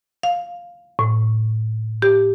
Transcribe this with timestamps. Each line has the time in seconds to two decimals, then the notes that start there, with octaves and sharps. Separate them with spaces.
0.23 F5
0.99 A2
2.02 G4